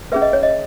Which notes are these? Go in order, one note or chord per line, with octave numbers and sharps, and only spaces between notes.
C#4 G#4 B4 E5
D#5
C#5
D#5